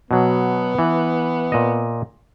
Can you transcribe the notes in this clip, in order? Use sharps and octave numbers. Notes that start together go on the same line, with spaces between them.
B2 F#3 B3
E3
A#2 D#5